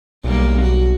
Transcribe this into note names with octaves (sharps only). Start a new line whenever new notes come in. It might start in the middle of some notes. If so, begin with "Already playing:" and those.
B1 G3 A#3
F#4